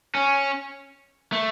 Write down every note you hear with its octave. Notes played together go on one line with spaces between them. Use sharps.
C#4
A3